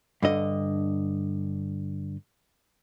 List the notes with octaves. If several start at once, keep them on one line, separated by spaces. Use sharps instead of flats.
G2 D3 D#5